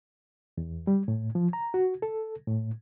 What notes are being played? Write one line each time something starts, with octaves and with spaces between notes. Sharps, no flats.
E2
G3
A2
F3
A#5
F#4
A4
A2